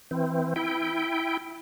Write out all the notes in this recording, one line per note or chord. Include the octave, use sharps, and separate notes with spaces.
E3 C4
E4 G5